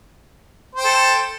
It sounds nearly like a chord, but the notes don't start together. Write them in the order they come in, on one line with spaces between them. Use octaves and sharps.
C5 G5 A4